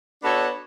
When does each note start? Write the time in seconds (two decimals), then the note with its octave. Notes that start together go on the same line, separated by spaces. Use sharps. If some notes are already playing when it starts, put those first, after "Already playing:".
0.22 B3 D4 F#4 A4 C#5